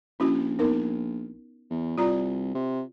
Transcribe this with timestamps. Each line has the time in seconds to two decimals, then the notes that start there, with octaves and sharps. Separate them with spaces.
0.20 A#1 C#4 E4 F#4
0.59 B3 D#4 A#4
1.70 E2
1.98 C2 F4 D5 A#5
2.54 C3